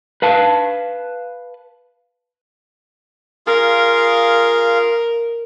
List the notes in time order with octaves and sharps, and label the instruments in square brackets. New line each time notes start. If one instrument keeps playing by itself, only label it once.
[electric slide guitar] B4 F5 A5
[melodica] F4 G#4 F5 [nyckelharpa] A#4